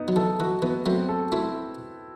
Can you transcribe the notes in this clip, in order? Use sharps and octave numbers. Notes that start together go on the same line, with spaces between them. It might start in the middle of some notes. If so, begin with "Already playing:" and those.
Already playing: B3 D#4
F#3
E3 A4
E3 F#4
E3 B3
F#3 A3 C4
A4
A3 C4 E4